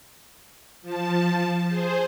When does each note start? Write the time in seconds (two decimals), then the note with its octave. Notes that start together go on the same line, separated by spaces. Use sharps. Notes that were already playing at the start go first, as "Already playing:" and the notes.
0.82 F3 A5
1.67 G#4 C5